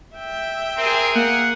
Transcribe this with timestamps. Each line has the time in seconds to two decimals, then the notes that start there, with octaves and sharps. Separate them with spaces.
0.16 E5 G5
0.78 C4 G#4 A#4
1.15 A#3 F#5